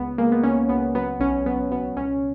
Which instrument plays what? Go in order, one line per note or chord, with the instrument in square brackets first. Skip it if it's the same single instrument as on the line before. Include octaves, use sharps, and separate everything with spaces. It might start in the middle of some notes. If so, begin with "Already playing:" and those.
Already playing: [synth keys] C#2 B3
G#3 A#3
B3
C#2 C#4
C#2 B3
F#3 B3
B1 C#4
F#3 B3
B2 B3
C#2 C#4